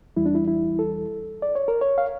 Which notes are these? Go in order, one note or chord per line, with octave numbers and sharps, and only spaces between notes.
E2 E3 G3 E4
D4
E4
E4
A4
D5
C#5
A#4
C#5
F5